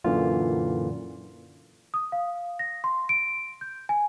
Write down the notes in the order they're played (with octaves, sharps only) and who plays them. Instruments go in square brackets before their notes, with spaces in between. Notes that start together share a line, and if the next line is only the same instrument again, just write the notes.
[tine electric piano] F#2 A#2 D3 E3 F4
[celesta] D#6
F5
A#6
C6
D7
G6
G#5